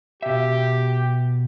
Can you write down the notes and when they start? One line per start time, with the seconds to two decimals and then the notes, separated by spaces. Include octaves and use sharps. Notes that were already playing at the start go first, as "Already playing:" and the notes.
0.22 B2 G4 E5